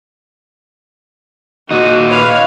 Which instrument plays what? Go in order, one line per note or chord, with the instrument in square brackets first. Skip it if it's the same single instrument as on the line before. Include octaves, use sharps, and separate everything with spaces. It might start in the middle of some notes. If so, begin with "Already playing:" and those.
[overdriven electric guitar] A#2 D#4 [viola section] F#4
[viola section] B4 C#5 F5